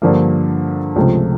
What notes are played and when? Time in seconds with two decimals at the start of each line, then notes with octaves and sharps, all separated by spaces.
0.02 G2 D3 F3 A#3
0.96 C#2 C3 F3 A3